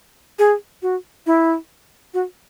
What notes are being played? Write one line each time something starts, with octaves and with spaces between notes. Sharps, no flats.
G#4
F#4
E4
F#4